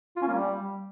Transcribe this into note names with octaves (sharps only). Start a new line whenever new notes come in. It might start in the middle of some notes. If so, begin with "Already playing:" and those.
F4
C#4
A#3
G3